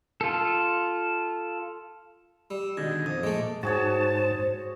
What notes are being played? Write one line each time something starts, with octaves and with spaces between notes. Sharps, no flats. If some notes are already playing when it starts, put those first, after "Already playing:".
F4 A4
G3 E6
B2 D3 D#3 G#3
F2 D#6
A#2 G#3 A3 D6
G#2 F#4 G#4 C5 C#5 A5